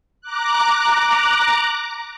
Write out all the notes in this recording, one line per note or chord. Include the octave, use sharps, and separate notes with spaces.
A#5 D6 F#6